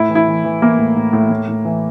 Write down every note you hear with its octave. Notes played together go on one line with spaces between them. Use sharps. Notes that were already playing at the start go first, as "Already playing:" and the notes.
Already playing: A2 E4
E3
E4
E3
E3
E3 A#3
A2
A2
A2
A2
A2
E3